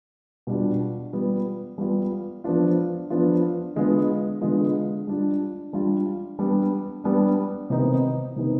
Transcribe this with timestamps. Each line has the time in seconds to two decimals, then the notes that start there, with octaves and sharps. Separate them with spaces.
0.47 B2 G3 D4 F4
1.13 G3 B3 F4
1.78 G3 B3 F4
2.44 F3 B3 D4 F4
3.10 F3 B3 D4 F4
3.76 D3 G#3 B3 F4
4.41 D3 G#3 B3 F4
5.07 G3 D4 F4
5.73 G3 D4 F4
6.39 G3 B3 D4
7.04 G3 B3 D4
7.70 C3 D#3 B3 D#4
8.36 C3 D#3 B3 D#4